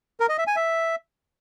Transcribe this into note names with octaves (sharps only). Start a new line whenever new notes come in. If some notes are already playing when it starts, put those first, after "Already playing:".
A#4
D#5
E5
G#5
E5